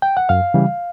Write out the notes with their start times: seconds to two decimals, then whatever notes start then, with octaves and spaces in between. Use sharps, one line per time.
0.02 G5
0.17 F#5
0.29 F#2 F5
0.54 C#3 E3 G3